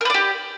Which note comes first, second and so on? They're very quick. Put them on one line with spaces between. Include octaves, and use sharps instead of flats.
A#4 B4 D5 G4